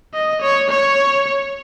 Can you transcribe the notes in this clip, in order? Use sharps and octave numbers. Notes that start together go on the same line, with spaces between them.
D#5
C#5
C#5